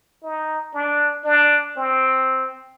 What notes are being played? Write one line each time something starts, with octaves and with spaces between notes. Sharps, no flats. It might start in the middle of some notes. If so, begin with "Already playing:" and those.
D#4
D4
D4
C4